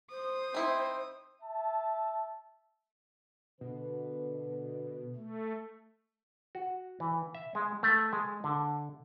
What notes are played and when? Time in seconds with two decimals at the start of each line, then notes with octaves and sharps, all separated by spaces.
0.11 C5 D#6
0.54 C4 D#4 E4
1.42 E5 A5
3.61 B2 D3 B4
5.16 A3
6.55 F#4
7.00 E3
7.35 E5
7.55 G#3
7.83 A3
8.13 G#3
8.44 D3